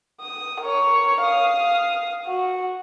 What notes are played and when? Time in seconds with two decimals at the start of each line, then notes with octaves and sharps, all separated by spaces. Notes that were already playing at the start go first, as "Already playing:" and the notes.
0.21 D#6
0.60 A#4 C#5
1.21 F5 D#6
2.26 F#4